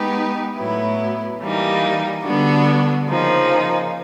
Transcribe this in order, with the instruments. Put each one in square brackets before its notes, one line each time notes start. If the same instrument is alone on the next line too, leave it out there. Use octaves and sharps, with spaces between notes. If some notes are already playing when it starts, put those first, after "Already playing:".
Already playing: [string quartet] G#3 B3 D#4 G4 B4
A2 F#3 B3 E4
E3 G3 A#3 D#4
D3 G3 B3 D4 F#4
C#3 F3 A#3 D#4